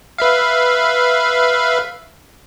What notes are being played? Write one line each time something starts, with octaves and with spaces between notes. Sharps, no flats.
B4 E5 F5